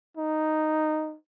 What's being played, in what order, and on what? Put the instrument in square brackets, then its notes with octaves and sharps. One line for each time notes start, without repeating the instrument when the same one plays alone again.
[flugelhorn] D#4